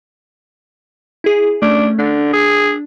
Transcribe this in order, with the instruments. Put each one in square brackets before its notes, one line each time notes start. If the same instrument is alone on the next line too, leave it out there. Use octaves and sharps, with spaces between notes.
[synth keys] E4 G#4
[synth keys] A3 C#4 [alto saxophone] D4
[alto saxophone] D3 [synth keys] D4
[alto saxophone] G#4